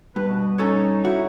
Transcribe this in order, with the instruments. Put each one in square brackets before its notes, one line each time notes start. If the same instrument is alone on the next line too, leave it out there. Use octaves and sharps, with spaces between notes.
[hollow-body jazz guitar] G2 [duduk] B4
[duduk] B2
[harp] C#4 A4 C#5 [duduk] D#4
[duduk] E4 [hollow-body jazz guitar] F#4